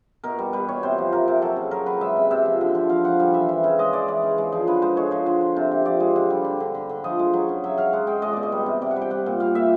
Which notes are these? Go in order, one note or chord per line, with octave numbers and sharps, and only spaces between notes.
B2 A#4
G3
G3 B4
B2 C#5
C3 C5
F3
C3 A#4
C3
F#3 A4
C#3
F#3 A#4
F#3 B4
G#3 E5
C3
C3 E5
F3
D3
F3
F3 F5
F3 F#5
G3 F5
E3 E5
E3
C#3
G#3 D#5
G#3 D5
E3 D5
C#3
G#3
F3
D3 B4
G#3 C5
G#3 C#5
F3 C5
D3
D3
C3
C3
F3 D5
G#3
D3
G3
D3
D3
D3
D3
F3 D#5
G#3
F#3
C#3
F#3 E5
F#3 F5
G#3 F#5
G#3 G5
G#3 D#5
B2 D5
D#5
G3
C3
C3 D5
F#5
G3
G5
G3 F#5
A#2
G3 F5
A#2 E5